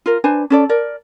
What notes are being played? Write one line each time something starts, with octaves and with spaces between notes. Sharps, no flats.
F4 A#4
D4 B4 C5 G#5
C#4 A4 D5
A#4 D5